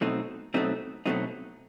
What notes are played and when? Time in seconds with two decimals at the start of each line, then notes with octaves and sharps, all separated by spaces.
0.01 B2 F#3 A3 C4 D#4
0.54 B2 F#3 A3 C4 D#4
1.06 B2 F#3 A3 C4 D#4